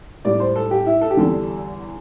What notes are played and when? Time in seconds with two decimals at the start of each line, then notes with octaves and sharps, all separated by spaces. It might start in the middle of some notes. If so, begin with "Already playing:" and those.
0.25 A2 G3 D5
0.40 C5
0.56 A4
0.71 G4
0.86 E4
1.01 A4
1.10 G4
1.17 E2 D3 G3 A4